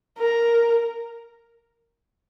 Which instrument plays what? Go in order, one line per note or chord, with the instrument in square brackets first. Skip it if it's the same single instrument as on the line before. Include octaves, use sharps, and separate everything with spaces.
[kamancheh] A#4